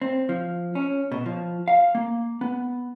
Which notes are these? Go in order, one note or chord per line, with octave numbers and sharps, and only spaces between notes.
C4
F3
C#4
B2
F3
F5
A#3
B3